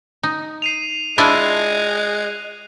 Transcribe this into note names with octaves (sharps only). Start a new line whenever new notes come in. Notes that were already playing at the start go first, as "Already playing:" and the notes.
D#4
C7 D#7 F7
G#3 D4 E4 F4 F#6 D#7